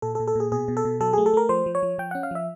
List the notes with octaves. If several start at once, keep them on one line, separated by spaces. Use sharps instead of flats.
A#2 A4
A4
A#2
A4
A#2 G#4
B2 G#4
B2
A4
B2
F#3 A4
A3 G#4
A4
A3 A#4
F3 C5
F3
C#5
F3
F3 G5
C#4 F#5
F5
F3 E5